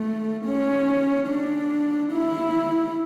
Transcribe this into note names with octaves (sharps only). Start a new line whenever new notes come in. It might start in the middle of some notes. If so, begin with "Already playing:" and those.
Already playing: A3
C#4
D4
E4